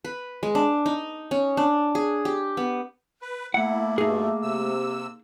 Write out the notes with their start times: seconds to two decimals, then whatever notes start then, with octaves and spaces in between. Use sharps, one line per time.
0.04 B4
0.43 G#3
0.55 D4
0.86 D#4
1.31 C#4
1.57 D4
1.95 G#4
2.25 G4
2.57 B3
3.22 B4
3.54 A3 A#3 E4 F#5
3.98 G2 B2 D#4 G#4
4.42 C3 E6